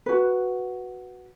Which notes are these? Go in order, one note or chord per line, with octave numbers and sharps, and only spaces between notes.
F#4 B4